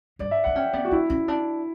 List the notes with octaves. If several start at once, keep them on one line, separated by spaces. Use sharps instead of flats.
G2 D5
E5
D4 F#5
C#4 G5
B3 D5
F#4
B3 E4
C#4
D4